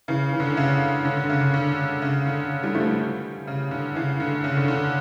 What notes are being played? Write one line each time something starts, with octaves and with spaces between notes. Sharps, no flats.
C#3 E3
E3
D3
C#3
D3
D3
C#3
D3
D3
C#3
D3
E3 G3
F3 A3
E3 G3
C#3
D3
C#3 E3
D3
C#3
D3
D3